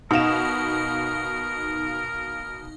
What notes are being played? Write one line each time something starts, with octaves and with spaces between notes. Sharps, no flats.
B2 D#4 A#4 F5 E7